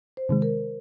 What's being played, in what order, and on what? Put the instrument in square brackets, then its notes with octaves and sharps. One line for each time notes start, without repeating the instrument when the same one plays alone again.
[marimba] C5
[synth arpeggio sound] C3 D#3 G#3
[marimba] A#4